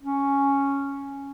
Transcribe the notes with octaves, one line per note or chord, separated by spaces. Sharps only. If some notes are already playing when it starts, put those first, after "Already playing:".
C#4